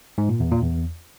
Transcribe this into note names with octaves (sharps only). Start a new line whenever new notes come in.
G#2
A#2
E2
A#2
E2